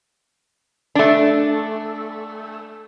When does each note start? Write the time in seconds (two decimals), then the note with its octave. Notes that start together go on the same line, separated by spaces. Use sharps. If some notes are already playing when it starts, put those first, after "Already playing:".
0.95 A3 D4